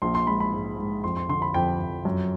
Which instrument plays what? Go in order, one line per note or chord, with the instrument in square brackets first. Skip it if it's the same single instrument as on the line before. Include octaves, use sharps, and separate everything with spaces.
[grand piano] A#1 C6
C6
G#3 B5
B5
G#2
G#2
F2 C6
C6
D3 C6
B5
F2 G5
F2
F#2